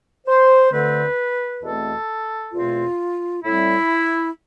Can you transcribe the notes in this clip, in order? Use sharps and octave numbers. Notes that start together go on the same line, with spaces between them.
C5
D2 D3 A3 C4 B4
E2 B2 A3 C4 A4
E2 B2 A3 C4 F4
A2 G3 C4 E4